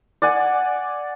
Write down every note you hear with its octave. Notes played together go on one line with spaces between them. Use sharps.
D5 F#5 G#5